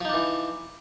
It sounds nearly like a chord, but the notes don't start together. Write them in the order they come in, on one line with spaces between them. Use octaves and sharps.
F3 D#4 D4 E3